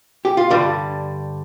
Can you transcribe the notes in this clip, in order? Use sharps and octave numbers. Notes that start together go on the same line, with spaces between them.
G4
F4
G2 D3 G3 D4